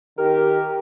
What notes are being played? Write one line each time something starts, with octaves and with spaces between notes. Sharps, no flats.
D#3 D#4 G4 A#4